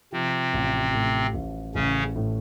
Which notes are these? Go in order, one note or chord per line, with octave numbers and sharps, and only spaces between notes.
C3 F3 C4
A1
A2
A1
A1 C#3 C#4
A2